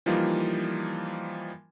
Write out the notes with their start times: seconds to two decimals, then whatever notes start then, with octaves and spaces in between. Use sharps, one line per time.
0.06 E3 F3 G3 A#3 D#4 F4